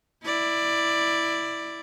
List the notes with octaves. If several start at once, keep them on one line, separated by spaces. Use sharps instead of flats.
E4 D5